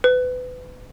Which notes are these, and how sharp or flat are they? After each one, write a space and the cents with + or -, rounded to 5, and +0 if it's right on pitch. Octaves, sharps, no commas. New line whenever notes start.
B4 +30